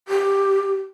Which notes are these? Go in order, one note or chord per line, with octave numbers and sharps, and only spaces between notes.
G4